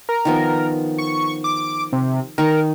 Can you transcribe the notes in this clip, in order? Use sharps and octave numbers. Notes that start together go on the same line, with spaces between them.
A#4
D#3 F3 B3
C#6
D6
C3
D#3 A#4 C#6